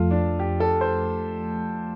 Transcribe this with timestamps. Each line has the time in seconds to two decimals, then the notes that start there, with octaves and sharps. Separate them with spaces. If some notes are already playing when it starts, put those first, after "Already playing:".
Already playing: F2 F3 A3 F4 A4
0.11 D4
0.39 G4
0.60 A4
0.81 C5